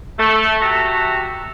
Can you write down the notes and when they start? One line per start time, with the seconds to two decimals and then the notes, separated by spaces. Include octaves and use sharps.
0.19 A3
0.61 F#4 G4 E5 A5 A#5